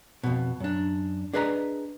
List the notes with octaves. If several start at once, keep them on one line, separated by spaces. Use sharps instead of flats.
F2 B2
F#2 D4
D4 G#4 B4 D#5 A#5